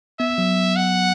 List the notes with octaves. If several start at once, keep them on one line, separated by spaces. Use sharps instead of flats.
B3 E5
F#3
F#5